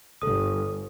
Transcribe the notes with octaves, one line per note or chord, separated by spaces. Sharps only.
G1 A4 D#6